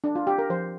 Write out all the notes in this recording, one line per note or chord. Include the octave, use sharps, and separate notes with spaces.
D4
F4
G4
A#4
F3 C5